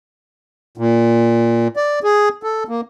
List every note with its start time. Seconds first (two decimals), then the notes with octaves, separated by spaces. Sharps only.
0.78 A#2
1.76 D5
2.03 G#4
2.43 A4
2.68 A#3